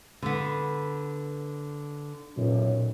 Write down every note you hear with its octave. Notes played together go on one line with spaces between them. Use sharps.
D3 B3
B1 F#2 A#2